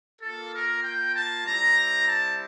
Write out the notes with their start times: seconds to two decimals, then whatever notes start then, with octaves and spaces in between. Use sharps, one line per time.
0.21 A#3 F4 A4
0.53 A#4
0.83 G5
1.14 A5
1.45 G3 C4 E4 A#5
2.07 A5